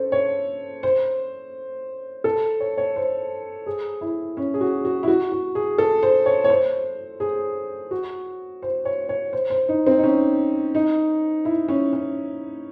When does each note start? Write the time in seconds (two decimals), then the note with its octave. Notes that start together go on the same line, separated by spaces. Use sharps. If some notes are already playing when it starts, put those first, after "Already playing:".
Already playing: C#4 A4 C5
0.12 C#5
0.83 C5
2.24 A4
2.60 C#5
2.78 C#5
2.96 C5
3.66 G#4
4.01 E4
4.37 C#4
4.54 G#4
4.61 F#4
4.85 F#4
5.03 E4
5.08 F#4
5.32 F#4
5.55 G#4
5.78 A4
6.03 C5
6.26 C#5
6.44 C#5
6.50 C5
7.20 G#4
7.91 F#4
8.62 C5
8.85 C#5
9.09 C#5
9.33 C5
9.50 C5
9.69 D#4
9.86 C4
9.98 D#4
10.03 C#4
10.75 D#4
11.45 E4
11.68 C#4
11.93 C#4